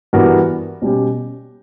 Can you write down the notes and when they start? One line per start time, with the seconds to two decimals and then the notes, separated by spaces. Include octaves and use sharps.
0.13 G2 E3 B3 F#4 A#4
0.82 B2 G3 C#4 G4